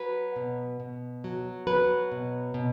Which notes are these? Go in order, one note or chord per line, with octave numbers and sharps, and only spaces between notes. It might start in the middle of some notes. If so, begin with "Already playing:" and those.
Already playing: F#3 B4
B2
B2
F#3
F#3 B4
B2
B2